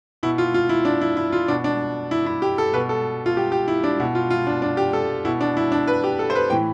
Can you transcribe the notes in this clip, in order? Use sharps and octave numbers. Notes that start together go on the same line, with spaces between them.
B2 E4
F4
F4
E4
D4
E4
E4
F4
B2 D4
D4
E4
E4
G4
A4
B2 B4
A4
F4
G4
G4
E4
D4
B2 E4
F4
F4
D4
D4
G4
A4
B2 E4
D4
E4
D4
B4
G4
A4
C5
B4
A2 E3 G5